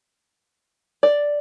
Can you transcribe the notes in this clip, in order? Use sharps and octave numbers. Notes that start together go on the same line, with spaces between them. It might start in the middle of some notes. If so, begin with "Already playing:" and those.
D5